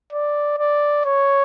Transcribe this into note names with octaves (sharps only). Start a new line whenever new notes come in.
D5
D5
C#5